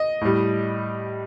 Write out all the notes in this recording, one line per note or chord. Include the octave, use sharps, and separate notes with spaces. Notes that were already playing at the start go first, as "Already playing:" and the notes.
Already playing: D#5
A2 G3